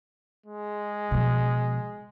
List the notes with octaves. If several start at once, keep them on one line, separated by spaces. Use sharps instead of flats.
G#3
B2 F3